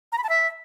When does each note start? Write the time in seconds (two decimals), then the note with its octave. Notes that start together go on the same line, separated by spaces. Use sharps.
0.12 A#5
0.18 B5
0.24 A5
0.29 E5